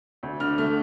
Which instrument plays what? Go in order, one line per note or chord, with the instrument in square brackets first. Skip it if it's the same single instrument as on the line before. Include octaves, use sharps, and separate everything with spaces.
[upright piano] D2
D3 F6
A3 F6